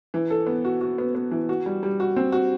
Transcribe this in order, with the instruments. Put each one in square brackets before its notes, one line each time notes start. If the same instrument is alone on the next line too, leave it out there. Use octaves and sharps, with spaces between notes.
[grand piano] E3
A4
B3
F#4
F#4
B3
B3
E3
F#4
G3
G3
F#4
C4
F#4